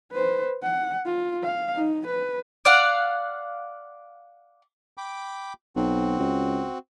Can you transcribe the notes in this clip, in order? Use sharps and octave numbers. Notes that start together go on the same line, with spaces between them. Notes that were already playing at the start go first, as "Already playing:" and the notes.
B4 C5
F#5
F4
F5
D#4
B4
D5 F5 F#5
G5 B5 D6
B1 C4 F#4
C#2